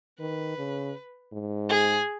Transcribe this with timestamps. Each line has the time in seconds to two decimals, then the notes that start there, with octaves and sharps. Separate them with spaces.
0.20 D#3 B4
0.58 C#3
1.33 G#2
1.69 G#4